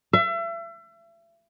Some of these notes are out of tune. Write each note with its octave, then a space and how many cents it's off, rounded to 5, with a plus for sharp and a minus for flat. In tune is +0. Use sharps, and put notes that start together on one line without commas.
E5 +35